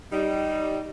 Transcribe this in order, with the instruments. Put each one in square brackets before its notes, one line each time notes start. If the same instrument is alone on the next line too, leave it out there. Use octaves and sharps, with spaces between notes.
[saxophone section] G3 D#4